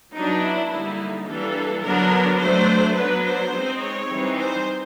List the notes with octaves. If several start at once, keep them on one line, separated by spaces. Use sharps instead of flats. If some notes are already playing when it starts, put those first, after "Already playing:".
F#3 B3 D4 D#4
E4
D3 G3 A#3 D#4 E4
E3 G3 A#3 D4 A4
D3 F#3 B3 D4 A#4
F#3 A3 D4 C5
F#3 B3 D4 B4
C5
G#3 C4 D#4
C#5
E3 G3 C4 D#4
C5